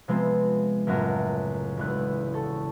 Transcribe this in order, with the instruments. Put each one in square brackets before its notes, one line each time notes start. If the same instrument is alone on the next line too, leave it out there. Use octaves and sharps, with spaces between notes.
[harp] C3 F3 G#3 B3 C4
C#2 F#2 A2 F#4 A4 A#4
E1 E2 F#6
A4 C#6